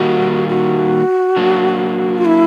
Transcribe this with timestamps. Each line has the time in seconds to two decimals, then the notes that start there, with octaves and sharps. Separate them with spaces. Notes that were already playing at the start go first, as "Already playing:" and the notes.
Already playing: D#3 G3 A#3 D#4 F#4
0.49 F#4
1.37 F#3 A#3 D4
2.18 F4
2.25 E4